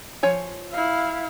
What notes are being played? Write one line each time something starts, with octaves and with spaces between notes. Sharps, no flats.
F3 C#5 G#5
E4 F5